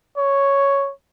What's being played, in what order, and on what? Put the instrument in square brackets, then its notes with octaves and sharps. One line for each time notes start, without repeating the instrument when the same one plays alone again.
[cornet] C#5